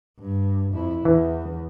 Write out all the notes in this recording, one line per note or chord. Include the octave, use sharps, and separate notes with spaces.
G2
F2 E4
E2 E3